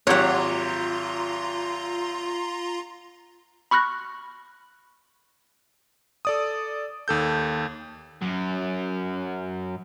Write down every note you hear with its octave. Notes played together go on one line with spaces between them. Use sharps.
G#1 F#3 F4 G4 C#5 F#5 A#5 C6
B5 C#6 F6 F#6 A#6
A4 D5 D#6
D#2 A4 G6
F#2 F#3